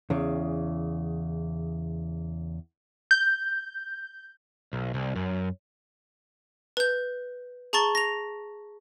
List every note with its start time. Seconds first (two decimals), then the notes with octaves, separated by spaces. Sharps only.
0.10 E2 C#3
3.11 G6
4.73 B1
4.94 C2
5.16 F#2
6.77 B4 G6
7.73 G#4 A5 A#5 C#6 A6 G7
7.95 A#6 F7